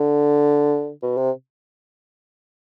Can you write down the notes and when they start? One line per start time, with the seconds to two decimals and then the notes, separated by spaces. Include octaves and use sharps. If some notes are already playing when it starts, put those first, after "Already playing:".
Already playing: D3
1.02 B2
1.17 C3